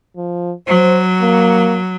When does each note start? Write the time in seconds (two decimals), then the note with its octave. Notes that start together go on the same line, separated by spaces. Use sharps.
0.17 F3
0.68 F#3 C5
1.22 A#3